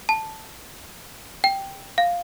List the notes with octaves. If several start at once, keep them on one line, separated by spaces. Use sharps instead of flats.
A5
G5
F5